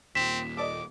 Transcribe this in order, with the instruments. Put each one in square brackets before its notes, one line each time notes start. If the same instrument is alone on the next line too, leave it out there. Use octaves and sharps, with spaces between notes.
[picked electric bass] D#2 A#2 [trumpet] C4 [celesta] B6 E7
[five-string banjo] A4 D5 D#5 [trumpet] D6